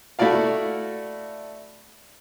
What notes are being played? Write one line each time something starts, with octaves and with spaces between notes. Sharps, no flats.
A3 E4 F#4 D5 F5